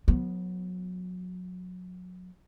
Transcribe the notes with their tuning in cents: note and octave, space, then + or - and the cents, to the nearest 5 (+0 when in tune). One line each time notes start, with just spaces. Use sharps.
F#3 -30 B3 +0